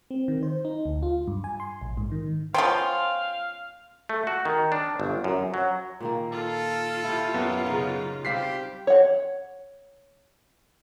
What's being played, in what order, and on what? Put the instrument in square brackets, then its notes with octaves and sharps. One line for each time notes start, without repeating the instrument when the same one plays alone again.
[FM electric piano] C4
D#3
C5
D#4
D2
F4
G2
G#5
C6
A#1
G#2
D#3
[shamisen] F3 C5 [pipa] B3 C#4 F4 [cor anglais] F5 [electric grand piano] G5
[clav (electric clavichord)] A3
F#4
D#3
D4
G1
F#2
F#3
[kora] A#2 D#3 A#3
[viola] F4 [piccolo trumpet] A4
[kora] E4 G4
[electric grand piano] F#2 B3
[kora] C#3 D#4
[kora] G3 C4 [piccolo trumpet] G4 [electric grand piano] F5 B6 C7
[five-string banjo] C#5 F#5